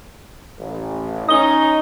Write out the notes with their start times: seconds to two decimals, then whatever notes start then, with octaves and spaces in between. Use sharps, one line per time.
0.58 A1
1.29 C#4 D#4 D#6 G7